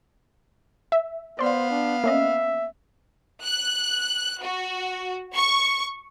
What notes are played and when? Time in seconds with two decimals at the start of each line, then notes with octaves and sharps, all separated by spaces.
0.92 E5
1.39 B3 C5 D5 F5 C6
1.70 D4
2.04 A#3 C#4 D#5 E5
3.43 F#6
4.42 F#4
5.35 C#6